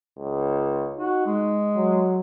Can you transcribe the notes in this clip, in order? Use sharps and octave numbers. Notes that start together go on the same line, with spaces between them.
C#2
D#4 F#4
G#3
F#3